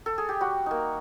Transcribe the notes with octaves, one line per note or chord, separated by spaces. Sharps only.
A4
G#4
G4
G3 F#4
A#3 D#4